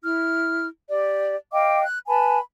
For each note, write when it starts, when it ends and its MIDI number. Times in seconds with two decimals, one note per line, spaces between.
0.03 0.67 64
0.03 0.67 89
0.90 1.36 67
0.90 1.36 74
1.52 1.82 75
1.52 1.82 77
1.52 1.82 79
1.52 1.82 86
1.83 1.98 90
2.07 2.38 71
2.07 2.38 80
2.07 2.38 81
2.07 2.38 83